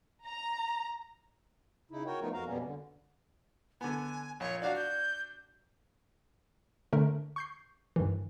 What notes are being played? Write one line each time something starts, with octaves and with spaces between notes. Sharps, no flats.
A#5
C#3 D#4 E4
F#4 A#4 C#5 G5
F3 A3 B3 D#4 F4 A#4
F2 F#4 A#4 F5 A#5
F2 B2 G3 A#3 B3 C#4
D3
D3 B3 G#5
A#1 C#5
D4 F#4 D5 F5
G6
D3 A3 A#4
C#6 G6 C7
G2 D#3 E3